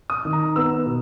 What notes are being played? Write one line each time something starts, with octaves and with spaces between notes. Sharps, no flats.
D#6
D#3
A#5
B3 E6
B2